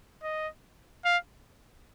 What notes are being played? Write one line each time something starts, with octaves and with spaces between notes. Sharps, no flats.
D#5
F5